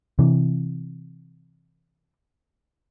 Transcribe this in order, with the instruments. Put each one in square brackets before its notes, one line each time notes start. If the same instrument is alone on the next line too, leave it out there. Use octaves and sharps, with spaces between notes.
[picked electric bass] C3 E3